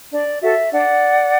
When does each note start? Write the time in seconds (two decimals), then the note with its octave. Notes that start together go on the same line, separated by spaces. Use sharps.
0.11 D4 D5
0.42 F#4 A4 E5
0.72 D4 D5 F#5